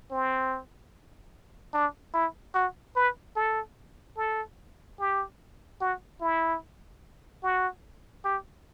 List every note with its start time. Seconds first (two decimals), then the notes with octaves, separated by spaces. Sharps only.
0.11 C4
1.74 D4
2.14 E4
2.54 F#4
2.96 B4
3.36 A4
4.17 A4
5.00 G4
5.81 F#4
6.20 E4
7.43 F#4
8.25 G4